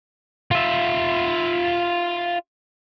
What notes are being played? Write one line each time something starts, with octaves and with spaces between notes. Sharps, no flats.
F4 E5